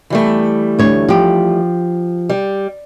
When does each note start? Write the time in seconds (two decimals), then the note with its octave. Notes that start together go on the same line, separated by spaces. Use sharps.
0.10 E3 G3 A3
0.79 D2 C#5
1.09 F3 G4
2.30 G3